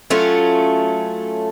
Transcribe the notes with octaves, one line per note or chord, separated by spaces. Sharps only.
F#3 A3 C#4 F4